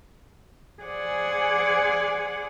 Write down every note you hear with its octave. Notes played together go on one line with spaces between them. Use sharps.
G#4 C5 D5 F#5 G#5